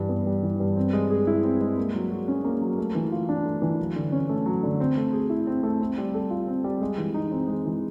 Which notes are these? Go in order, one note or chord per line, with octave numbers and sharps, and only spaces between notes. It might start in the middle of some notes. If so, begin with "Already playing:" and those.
Already playing: G2 E3
B3
G3
E3
G2
C4
G#3
G#4
E4
C4
G#3
A#3
F#3
F#4
C#4
A#3
F#3
A3
E3
F4
D4
A3
E3
F#3
D3
C#4
A3
F#3
D3
C4
A3
G#4
E4
C4
A3
C4
G3
A4
F4
C4
G3
G#3
E3
D#4
C4
G#3
E3